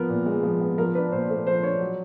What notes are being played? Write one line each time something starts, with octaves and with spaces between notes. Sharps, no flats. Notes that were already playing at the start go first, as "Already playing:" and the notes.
Already playing: F3 B3 A#4
A#2
G#3
F3
B3
F3 A#4
D4 B4
A#2 C5
A3 C5
F3 C5
D4 C#5
F#3